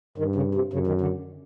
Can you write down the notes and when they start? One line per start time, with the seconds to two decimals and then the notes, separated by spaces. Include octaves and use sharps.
0.18 G2 D#3
0.36 C#3
0.55 C3
0.73 F#2 C#3
0.87 D#3
1.01 D3